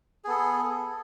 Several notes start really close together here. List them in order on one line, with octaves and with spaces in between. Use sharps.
G#4 B3 A4